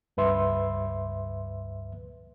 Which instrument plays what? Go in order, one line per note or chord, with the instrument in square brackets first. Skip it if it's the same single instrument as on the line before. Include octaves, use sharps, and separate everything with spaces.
[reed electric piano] C#2 G2 B4 E5 C6